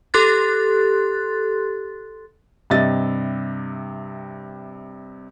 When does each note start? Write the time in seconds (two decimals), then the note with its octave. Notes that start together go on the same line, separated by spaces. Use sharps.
0.14 G4 A4 C6 F#6 A6
2.70 G2 C3 D#5 E5 A6